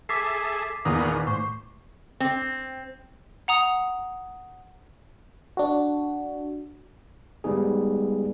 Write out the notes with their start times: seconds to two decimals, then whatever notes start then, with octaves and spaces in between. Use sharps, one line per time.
0.09 G#4 A4 E5 D6 B6 C7
0.85 E2 A#2 D#3 A#3 B3 D#4 D#6
1.27 A2 C5 C#6
2.20 C4
3.48 F#5 A#5 D#6
5.57 D4 F#4
7.44 G3 G#3 B3 D#4 G#4